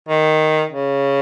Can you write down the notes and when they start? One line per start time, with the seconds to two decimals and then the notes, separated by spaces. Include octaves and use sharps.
0.09 D#3
0.69 C#3